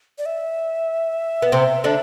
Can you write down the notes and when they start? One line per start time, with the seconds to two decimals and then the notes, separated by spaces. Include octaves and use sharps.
0.18 D5
0.26 E5
1.42 B3
1.52 C3 C4
1.84 D3 D4